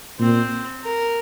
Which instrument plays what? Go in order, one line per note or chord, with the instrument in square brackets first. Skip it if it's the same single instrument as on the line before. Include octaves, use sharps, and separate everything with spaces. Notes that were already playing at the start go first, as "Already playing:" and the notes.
[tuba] A#2 [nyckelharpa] C4
[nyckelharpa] A#4